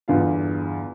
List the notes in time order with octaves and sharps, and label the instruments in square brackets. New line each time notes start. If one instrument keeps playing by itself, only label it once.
[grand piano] G1 E2 D3 F4 F5